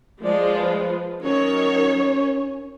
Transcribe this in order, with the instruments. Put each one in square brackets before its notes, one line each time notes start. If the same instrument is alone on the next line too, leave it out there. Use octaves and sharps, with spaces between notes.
[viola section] F3 G#3 F4 [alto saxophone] D5
[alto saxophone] B4
[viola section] D#3 F#3 C#5 [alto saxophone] C#4